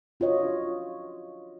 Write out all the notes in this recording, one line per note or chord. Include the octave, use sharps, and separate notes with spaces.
D4 F4 F#4 C#5 D#5